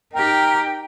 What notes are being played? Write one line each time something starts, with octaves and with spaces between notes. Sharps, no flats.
D#4 G4 A#4 G5